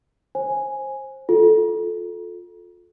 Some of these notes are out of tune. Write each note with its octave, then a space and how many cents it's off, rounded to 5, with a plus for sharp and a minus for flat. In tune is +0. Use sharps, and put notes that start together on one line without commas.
C5 +25 G#5 +0
F4 +25 A4 -15